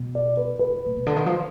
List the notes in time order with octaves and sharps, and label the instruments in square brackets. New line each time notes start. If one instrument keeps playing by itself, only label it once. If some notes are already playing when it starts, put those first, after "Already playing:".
Already playing: [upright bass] B2
[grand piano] D5
B4
B4
[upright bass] A#2
B2
D3
D#3
F3